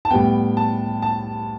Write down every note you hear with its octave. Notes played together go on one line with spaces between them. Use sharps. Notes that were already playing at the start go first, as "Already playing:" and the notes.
A5
A2 G3 B3 G5
A5
A5